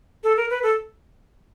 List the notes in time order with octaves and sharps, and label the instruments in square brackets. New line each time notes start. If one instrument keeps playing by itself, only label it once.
[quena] A4
A#4
B4
A4